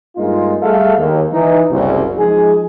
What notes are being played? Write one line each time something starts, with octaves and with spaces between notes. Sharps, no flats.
G2 G#3 A#3 D#4 F4
G3 A3 G#4 A4 E5 F5
D#2
E3 D#4
F#1 C2
F3 G#3 D#4 G#4